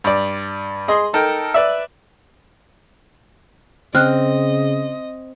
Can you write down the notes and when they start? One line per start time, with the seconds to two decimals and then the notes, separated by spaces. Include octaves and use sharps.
0.04 G2 D5
0.88 G#4 D#5 C6
1.13 D#4 A4 A#4 G5
1.54 B4 D5 E5
3.95 C#3 C4 D#5 F6 F#6